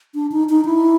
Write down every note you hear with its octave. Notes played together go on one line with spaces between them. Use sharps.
D4
D#4
D#4
E4